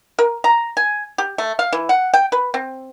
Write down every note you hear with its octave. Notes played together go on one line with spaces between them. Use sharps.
A#4
A#5
G#5
G4
A3
F5
E3
F#5
G5
B4
C4